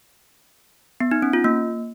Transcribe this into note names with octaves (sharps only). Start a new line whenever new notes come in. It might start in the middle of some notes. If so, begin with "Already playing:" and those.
B3
D#4
C#4
F4
A#3